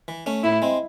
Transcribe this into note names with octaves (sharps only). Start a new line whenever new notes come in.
E3
A3 C#4
A2 E4
G#3 C4